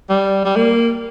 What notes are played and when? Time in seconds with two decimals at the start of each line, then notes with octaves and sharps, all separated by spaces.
0.10 G3
0.45 G3
0.56 A#3